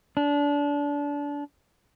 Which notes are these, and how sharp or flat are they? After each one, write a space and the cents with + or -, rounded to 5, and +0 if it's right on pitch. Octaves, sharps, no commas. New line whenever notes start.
D4 -25